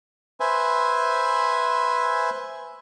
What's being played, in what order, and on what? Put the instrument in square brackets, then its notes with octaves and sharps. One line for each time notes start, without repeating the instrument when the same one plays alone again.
[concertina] B4 C5 E5 G#5